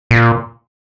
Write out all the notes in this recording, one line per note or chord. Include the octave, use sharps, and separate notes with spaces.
A#2